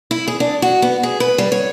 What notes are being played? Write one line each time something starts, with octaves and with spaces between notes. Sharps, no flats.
E4
G#4
D4
F#4
B3
G#4
B4
G3
C#5